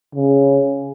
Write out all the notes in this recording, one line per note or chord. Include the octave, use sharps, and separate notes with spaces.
C#3